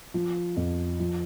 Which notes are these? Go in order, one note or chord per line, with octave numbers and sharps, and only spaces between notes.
F3
F2
F3